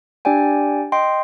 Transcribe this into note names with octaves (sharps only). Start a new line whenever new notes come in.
D4 G4 D5 G5 G#5
D#5 G5 C6